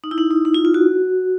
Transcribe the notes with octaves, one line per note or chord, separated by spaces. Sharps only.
D#4
E4
D#4
D#4
D#4
F4
F4
F#4